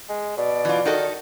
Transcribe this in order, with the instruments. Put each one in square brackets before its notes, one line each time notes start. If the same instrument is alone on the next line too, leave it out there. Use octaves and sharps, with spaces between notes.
[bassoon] G#3
[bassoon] B2 [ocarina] D5
[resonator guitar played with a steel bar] E3 F4
[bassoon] D#3 [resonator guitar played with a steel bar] D#4 F#4 A4